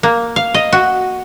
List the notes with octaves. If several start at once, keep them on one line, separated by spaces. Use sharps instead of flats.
A#3
F5
D#5
F#4